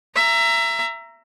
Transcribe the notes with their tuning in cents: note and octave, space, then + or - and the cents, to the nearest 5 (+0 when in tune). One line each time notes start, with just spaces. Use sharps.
E5 +25 A#5 +0